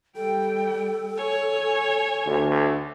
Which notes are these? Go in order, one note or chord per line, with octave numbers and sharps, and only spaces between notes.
G3 A4 G5
C#5 G#5
D2